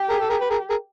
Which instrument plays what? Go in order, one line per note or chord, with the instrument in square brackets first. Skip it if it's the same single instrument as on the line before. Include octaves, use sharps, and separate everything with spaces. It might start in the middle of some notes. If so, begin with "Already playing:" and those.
Already playing: [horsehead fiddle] G4
[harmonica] G#4 A#4
A4
G#4 A#4
B4
G#4 A#4
G#4 A#4